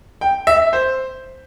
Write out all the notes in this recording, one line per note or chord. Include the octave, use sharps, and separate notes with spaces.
G5
E5
C5